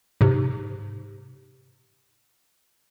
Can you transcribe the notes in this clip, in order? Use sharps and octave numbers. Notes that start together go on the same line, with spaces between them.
G#2 C3